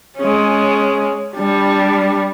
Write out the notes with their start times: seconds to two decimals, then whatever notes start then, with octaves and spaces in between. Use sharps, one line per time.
0.17 G#3 C#4
1.35 G3 D4